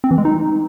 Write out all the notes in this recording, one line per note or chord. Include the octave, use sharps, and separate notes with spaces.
C4
E3
G#3
D#4